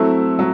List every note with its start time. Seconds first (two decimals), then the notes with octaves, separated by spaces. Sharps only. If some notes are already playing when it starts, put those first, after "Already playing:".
Already playing: F#3 A3 C4 E4 A4
0.39 F#3